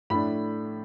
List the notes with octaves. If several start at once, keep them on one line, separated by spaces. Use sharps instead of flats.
A2 A3 D4 B5